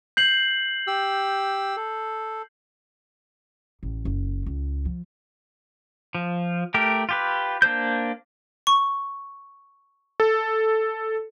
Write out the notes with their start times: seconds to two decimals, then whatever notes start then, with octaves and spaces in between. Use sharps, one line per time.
0.17 G6 C7 F#7
0.87 G4 E6
1.77 A4
3.83 A1
4.05 F#1
4.46 C#2
4.85 F3
6.15 F3
6.74 A3 G4 A#4
7.09 F4 G4 B4
7.62 A#3 D4 C5 G6
8.67 C#6
10.20 A4